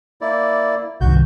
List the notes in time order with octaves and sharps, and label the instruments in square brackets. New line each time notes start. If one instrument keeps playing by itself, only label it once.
[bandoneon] A#3 E4 D5
[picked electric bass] C2 G2 D#3 [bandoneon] F#4 G6